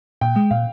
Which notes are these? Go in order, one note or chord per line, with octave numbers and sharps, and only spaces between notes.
A#2 G5
G#3
A#2 F5